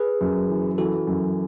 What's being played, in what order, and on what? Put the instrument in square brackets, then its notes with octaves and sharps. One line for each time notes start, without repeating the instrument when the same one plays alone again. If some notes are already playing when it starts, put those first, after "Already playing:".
Already playing: [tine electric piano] G#4 B4
[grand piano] F#2
E3
[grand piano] E3 [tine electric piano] F#4 A4
[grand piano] F#2